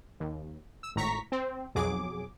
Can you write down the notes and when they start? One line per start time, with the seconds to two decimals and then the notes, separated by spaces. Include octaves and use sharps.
0.20 D#2
0.83 E6
0.96 G#1 A2 A#5 C#6 B6
1.32 C4
1.75 B1 F2 F#3 G#4 D6